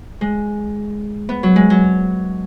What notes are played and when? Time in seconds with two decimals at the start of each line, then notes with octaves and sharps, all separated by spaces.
0.21 G#3
1.29 B3
1.43 F#3
1.56 G#3
1.70 F#3